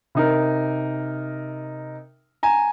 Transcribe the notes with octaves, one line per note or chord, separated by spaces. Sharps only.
C3 D#4 A#4
G#5 A#5